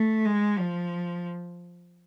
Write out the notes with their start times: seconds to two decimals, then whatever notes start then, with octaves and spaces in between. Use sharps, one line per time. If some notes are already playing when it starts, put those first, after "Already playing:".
Already playing: A3
0.25 G#3
0.58 F3